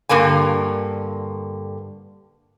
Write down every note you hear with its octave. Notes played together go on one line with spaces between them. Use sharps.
G2 D3 A#3 G#5